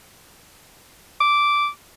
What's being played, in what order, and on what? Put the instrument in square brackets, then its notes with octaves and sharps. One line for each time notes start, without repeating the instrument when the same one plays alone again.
[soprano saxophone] D6